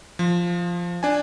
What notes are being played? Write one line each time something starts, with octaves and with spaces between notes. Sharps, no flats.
F3
D4 G#5